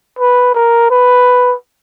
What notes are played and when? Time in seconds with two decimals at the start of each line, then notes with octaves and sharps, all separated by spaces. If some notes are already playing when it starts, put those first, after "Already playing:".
0.19 B4
0.55 A#4
0.91 B4